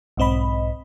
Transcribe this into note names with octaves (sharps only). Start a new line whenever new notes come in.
B1 G#2 C4 D#5 B5